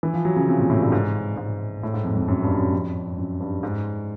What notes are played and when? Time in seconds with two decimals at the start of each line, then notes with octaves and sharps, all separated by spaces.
0.03 E3
0.14 F3
0.25 F#3
0.36 C#3
0.48 C3
0.60 A#2
0.70 A2
0.81 G2
0.92 G#2
1.37 G#2
1.83 A2
1.94 G#2
2.05 F2
2.16 F2
2.28 F#2
2.43 G2
2.57 F#2
2.73 F2
3.18 F#2
3.40 G2
3.63 G#2